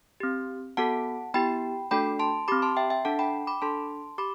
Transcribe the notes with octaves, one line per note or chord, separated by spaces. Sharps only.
C4 G4
B3 F#4 A4 F#5 A5
B3 E4 G4 G5 B5
A3 D4 F#4 A4 G5 B5
A5 C6
C4 G4 B5 D6
A5 C6
E5 G5
E5 G5
D4 A4 F#5 A5
G5 B5
B5 D6
D4 A4 A5 C6
G4 B5 D6